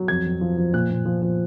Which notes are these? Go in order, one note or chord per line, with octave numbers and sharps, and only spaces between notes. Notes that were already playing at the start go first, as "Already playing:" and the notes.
Already playing: F#3
F2 G#6
F2
F3
F3
A#2 F#6
A#2
F3
F3